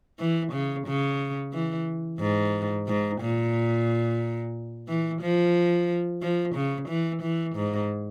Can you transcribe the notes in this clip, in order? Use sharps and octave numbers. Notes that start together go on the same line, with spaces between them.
E3
C#3
C#3
E3
G#2
G#2
A#2
E3
F3
F3
C#3
E3
E3
G#2